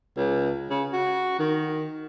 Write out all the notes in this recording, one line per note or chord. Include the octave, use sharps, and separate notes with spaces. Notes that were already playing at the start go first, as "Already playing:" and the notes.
C#2
C#3
F#4
D#3